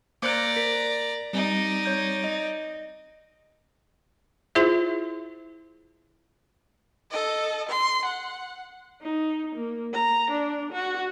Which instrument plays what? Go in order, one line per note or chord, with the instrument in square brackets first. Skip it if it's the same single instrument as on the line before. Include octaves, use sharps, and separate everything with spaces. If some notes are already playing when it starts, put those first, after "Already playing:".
[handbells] A#3 C5 C#7 [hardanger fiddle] D5 A#5 [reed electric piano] D6 F#6
[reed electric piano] A#4 [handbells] B6
[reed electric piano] G3 C4 [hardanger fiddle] D#4 D5
[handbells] C#5 G6
D#5
[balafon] E4 F4 G#4 C5 E5
[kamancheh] A4 D#5
C6
F#5
[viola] D#4
A#3
A#5
D4
F#4